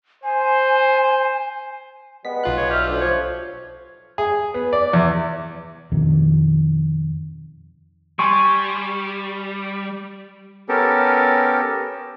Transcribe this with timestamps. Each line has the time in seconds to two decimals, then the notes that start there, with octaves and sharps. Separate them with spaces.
0.24 C5 G#5
2.25 G3 G#3 B3 B6
2.44 B1 F4 F#6
2.57 C#3 G#3 B3 C#5
2.70 G2 G4 E5 F6
2.87 D2
3.01 F3 C#5
4.18 G#4
4.54 B3
4.73 D5
4.93 E2
5.92 F2 B2 D#3
8.19 G3 G#5 C6 C#6
10.69 B3 C#4 G4 A4 A#4